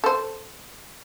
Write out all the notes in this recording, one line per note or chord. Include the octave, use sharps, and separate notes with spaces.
A4 C5